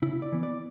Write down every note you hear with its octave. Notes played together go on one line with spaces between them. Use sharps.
C#3 E4
D5
E3 B3
D5